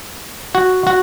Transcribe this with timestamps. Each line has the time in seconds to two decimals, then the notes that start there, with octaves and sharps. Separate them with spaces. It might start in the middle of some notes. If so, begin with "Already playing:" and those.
0.55 F#4
0.87 F#4